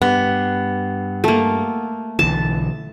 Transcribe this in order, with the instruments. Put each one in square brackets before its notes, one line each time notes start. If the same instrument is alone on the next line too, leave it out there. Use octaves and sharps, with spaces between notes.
[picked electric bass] G2 [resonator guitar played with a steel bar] B3
[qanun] A3 A#3
[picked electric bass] B1 D3 E3 [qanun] A5